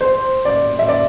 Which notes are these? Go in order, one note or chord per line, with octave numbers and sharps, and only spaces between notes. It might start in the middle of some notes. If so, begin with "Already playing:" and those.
C5
D5
E5
D5